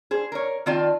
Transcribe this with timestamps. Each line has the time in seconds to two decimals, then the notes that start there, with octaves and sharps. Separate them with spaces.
0.11 G#4 C5
0.32 A#4 C#5
0.66 D#3 C4 F4 D5 A5